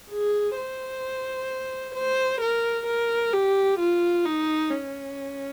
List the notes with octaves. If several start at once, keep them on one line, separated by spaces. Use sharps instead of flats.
G#4
C5
C5
A#4
A#4
G4
F4
D#4
C#4